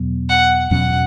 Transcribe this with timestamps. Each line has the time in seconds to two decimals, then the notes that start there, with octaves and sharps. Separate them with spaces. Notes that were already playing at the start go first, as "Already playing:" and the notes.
Already playing: E2 B2 F#3 B3
0.29 F#5
0.71 E2 B2 F#3 C#4 F#5